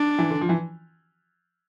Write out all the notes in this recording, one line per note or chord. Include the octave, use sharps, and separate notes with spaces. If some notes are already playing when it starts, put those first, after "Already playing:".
Already playing: D4
E3
D3
F3
E3